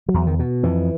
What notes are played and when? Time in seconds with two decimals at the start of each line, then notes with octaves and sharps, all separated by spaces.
0.08 F#3
0.14 E2
0.27 D#3
0.39 B2
0.63 F2 E3